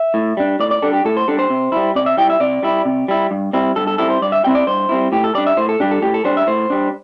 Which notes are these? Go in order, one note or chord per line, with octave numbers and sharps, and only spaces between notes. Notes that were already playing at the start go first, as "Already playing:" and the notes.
Already playing: E5
A2
G3 D4
A2 D5
D5
G3 D4 A4
G4
A2 A4
C5
G3 D4 A4
C5
C3
G3 E4
C3 D5
E5
G3 E4 G5
E5
C3 D5
G3 E4
C3
G3 E4
G2
G3 C4 E4
G2 A4
A4
G3 C4 E4 A4
C5
G2 D5
E5
G3 C4 E4 G5
D5
G2 C5
G3 C4 E4
A2 G4
A4
G3 D4 D5
E5
A2 C5
A4
G3 D4 G4
A4
A2 G4
A4
G3 D4 C5
E5
A2 C5
G3 D4